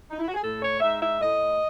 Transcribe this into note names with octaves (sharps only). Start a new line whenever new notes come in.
D#4
E4
F#4
G#4
A2 A4
C#5
G#3 D#4 E5
E5
A2 D#5